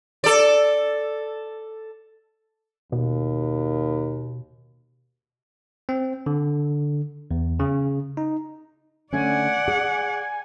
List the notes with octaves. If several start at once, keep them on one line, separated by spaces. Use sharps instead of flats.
A4 D5
D#2 B2
C4
D3
E2
C#3
D#4
D3 A3 C#4 D5 F#5 G#5
G#4